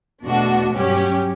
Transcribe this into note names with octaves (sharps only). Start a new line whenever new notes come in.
E2 B2 A3 D4 F#4
G2 F#3 C#4 G4